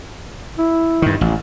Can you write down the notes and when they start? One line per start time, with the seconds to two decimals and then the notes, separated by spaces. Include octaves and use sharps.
0.59 E4
1.02 G2 D#3
1.21 A1